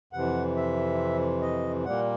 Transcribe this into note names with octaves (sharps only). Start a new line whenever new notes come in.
F2 C3 E3 F#5
E5
D#5
A#2 G3 A#3 F#5